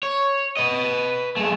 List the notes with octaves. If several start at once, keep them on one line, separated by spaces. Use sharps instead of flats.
C#5
B4 D#5
G#3 A3